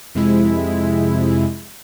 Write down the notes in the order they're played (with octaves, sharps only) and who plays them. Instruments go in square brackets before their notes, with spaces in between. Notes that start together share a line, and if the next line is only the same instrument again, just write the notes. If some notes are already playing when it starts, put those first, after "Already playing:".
[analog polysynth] F2 C3 G#3 E4